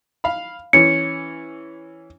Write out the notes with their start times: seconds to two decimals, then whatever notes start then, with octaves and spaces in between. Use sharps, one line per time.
0.24 F5 B5
0.73 E3 C#4 C#7